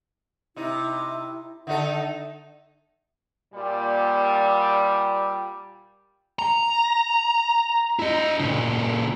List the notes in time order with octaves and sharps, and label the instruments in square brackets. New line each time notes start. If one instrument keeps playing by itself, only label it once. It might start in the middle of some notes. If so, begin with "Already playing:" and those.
[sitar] C3 D#4 [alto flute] E4
[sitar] D3 D#4 A4 [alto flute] E5
[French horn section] A#2 G3
[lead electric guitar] A#5
E4 D#5
A#2 C#3